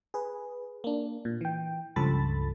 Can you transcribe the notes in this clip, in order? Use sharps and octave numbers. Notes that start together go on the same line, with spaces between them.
G#4 B4
A#3 D4
A#2
E3 G5
C#2 G2 F3 A4 B5 A6